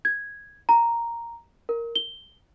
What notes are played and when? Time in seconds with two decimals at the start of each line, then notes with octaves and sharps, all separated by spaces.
0.05 G#6
0.69 A#5
1.69 A#4
1.96 G7